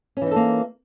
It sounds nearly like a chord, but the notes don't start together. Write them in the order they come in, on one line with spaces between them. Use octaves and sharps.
C#4 E3 D#4 A4 A#3